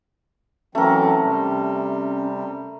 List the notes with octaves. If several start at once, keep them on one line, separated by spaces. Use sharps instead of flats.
E3 F#3 A3 C4 C#4 A#4
C3 G3